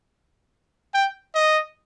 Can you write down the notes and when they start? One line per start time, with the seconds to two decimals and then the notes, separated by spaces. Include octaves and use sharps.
0.94 G5
1.35 D#5